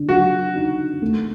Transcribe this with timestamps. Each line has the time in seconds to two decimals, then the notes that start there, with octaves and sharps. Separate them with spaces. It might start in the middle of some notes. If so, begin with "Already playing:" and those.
Already playing: D3
0.09 F#3 F#4
0.55 D#4
1.02 A3